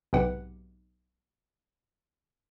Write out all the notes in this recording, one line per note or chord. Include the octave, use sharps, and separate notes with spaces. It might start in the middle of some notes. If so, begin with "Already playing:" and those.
B1 G#2 C3 G4 B4 F#5